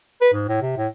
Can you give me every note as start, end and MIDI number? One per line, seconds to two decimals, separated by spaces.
0.21 0.29 71
0.34 0.46 44
0.48 0.61 45
0.62 0.77 48
0.77 0.87 45